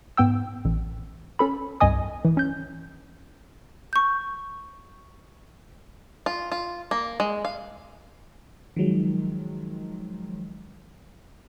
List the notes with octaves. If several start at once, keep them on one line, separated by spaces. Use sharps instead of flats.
G#2 B3 G5 E6
A1
C#4 A4 B5
C2 G2 D#5 G#5 D#6
E3
C#4 G6
C#6 G6
F4
F4
A#3
G#3
F5
D#3 F3 F#3 G#3